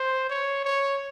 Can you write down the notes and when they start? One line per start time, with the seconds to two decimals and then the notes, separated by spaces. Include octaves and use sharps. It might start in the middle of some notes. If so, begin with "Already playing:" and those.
Already playing: C5
0.30 C#5
0.65 C#5